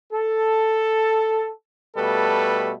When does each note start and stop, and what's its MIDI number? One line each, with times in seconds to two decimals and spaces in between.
0.12 1.49 69
1.96 2.73 47
1.96 2.73 55
1.96 2.73 57
1.96 2.73 69
1.96 2.73 71